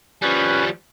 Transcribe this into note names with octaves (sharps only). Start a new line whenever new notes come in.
F3 G3 C#4 B4 F#6